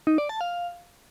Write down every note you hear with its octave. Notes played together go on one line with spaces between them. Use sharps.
D#4
D5
A5
F5